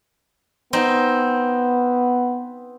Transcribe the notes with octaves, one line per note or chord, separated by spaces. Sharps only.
B3 C4 D#4